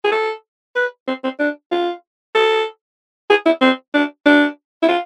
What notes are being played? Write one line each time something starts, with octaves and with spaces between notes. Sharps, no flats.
G#4
A4
B4
C4
C4
D4
F4
A4
G#4
E4
C4
D4
D4
E4
F4